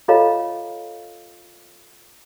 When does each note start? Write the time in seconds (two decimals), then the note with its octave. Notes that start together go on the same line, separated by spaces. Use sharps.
0.08 F4 A4 C#5 D#5 F5 A#5